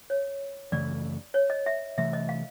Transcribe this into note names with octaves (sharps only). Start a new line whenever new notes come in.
C#5
F#2 C#3 E3 A3 D5
C#5
D#5
E5
C3 E3 A3 E5
D#5
F5